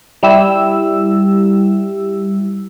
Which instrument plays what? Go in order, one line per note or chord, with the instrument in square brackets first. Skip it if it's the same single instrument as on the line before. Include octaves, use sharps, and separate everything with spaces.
[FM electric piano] G3 E4 G4 E6